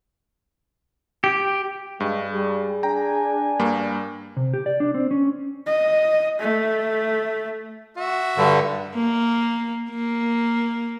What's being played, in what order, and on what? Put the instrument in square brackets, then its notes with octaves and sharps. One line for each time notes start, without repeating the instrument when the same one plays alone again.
[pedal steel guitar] G4
[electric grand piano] G2 [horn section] G3 [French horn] G#3
[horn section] G3 [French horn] G#4
[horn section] D4 G#5 [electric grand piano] G5 A#5
[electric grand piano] G2 G3 A#3
[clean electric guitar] C3
G4
D5
D4
C4
C#4
[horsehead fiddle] D#5
A3
[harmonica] F#4 E5
[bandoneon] G2 D3
[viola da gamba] A#3
A#3